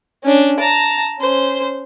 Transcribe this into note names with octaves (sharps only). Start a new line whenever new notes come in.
C#4 D4
A5 A#5
C#4 C5